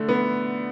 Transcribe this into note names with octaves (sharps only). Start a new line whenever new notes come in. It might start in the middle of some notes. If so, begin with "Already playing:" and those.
Already playing: D3 A3
B3